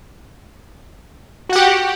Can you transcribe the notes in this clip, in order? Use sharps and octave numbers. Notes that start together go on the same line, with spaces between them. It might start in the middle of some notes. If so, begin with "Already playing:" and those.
F#4 G4 F#5 G5